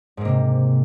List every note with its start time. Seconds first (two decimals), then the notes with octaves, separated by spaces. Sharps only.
0.17 G#2
0.21 A#3
0.25 C3